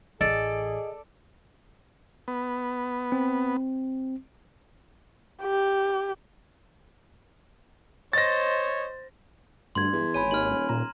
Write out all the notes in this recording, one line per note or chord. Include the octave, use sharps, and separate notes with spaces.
A1 G#4 A4 D5 D#5
B3
C4
G4
C5 C#5 D#5 A6 A#6
D2 G2 C6 G#6
E2
G#1 C#5 G#5 B5 D#7
D#2 F6 F#7
D#1
A#2 A#5